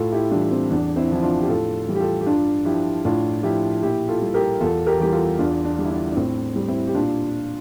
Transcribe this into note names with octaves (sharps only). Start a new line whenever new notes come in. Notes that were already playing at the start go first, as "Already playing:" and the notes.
Already playing: A2 F4 A4
E4 G4
E3 G3 D4 F4
C4
E2 D4
C4 E4
D3 F3 E4
D4 F4
G4
A2 F4 A4
E3 G3
G4
F4 A4
G4
G2 D4 F4
F3 E4 G4
A2 D4 F4
F3 E4 G4
A#2 E4 G4
F4 A4
G3
G4 A#4
E2 F4 A4
G4 A#4
E3 G3 G4
F4 A4
E2 D4 F4
D4
D3 G3
E4
D4
D4
A2 C4
G3
C4 E4
G4
A#2 D4 F4